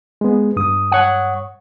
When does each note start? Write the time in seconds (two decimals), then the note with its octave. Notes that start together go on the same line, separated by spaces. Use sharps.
0.21 G#3 B3
0.57 G2 D#6
0.92 C#5 F#5